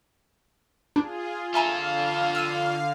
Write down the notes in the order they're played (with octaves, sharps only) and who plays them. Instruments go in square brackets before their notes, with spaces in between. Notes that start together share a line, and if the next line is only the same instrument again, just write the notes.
[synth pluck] D4 [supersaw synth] F4 G#4
[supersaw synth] D3 F5 [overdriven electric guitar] F4 A4 [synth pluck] E5 G#5 A#5
[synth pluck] E6 D#7